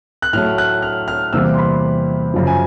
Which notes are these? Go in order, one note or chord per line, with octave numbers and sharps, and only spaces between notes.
F#6
A2 F#3 A3 F6
F#6
F6
F6
E2 C3 E3 G3 A#3 E6
C6
B5
F#2 C#3 F3
G#5